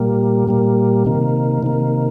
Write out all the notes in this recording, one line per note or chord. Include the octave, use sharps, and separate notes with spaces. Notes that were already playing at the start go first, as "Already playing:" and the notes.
Already playing: A#2 G3 A#3
A#2 G3 A#3
C3 D#3 A#3
C3 D#3 A#3